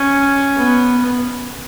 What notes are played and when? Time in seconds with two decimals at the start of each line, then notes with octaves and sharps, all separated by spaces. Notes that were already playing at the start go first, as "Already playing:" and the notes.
Already playing: C#4
0.56 B3